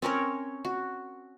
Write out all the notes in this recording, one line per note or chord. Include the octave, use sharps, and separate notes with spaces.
C4 C#4 A#4 C#5
F#4